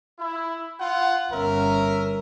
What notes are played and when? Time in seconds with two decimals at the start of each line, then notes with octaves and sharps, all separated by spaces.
0.19 E4
0.79 F4 F#5
1.31 G1 C#4 A#4 E5